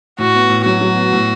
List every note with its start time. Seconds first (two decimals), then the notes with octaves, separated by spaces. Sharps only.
0.19 A2 F#4
0.34 B3
0.50 A2
0.65 F#3 F#4
0.81 F#3
0.97 B3
1.13 A2